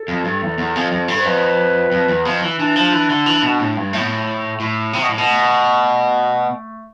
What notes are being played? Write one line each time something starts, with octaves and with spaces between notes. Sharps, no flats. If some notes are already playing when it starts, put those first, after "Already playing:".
Already playing: A4
F2
G2
E2
E2
F2
F2
G2
C5
F2 B4
F2
E2
F2
E3
E3 D4
F3
E3
D3
E3
B2
A2
G2
A2 A3
B3
A3
A2
C3
B2
A2
B2
A3